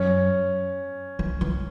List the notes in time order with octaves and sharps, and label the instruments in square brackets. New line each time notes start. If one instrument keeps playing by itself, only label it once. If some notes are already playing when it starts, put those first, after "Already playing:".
Already playing: [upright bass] F#2 [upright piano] C#4
[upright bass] E3
E3